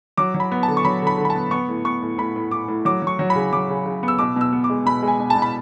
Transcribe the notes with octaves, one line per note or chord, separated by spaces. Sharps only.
F#3 D6
F#3
B5
B3
A5
D3
C#6
F#3 B5
D3 B5
D3
B5
A5
B3
B3 C#6
A2
B3 C#6
A2
A2 B5
A2
A2 D6
A2
F#3 D6
F#3 C#6
F#3
B5
C#3
F#3 D6
C#3
C#3
B3
E6
B2 D6
B2 E6
B3
D6
G#3
B2 B5
G#3
G#5
B2
A5
B2
B5